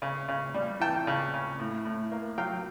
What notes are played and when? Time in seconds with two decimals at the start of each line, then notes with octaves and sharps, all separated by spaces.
0.02 C#3
0.28 C#3
0.54 G3
0.80 E3 G5 A5
1.07 C#3
1.34 C#3
1.59 A2
1.85 A2
2.12 A#3
2.38 F#3 F5 G5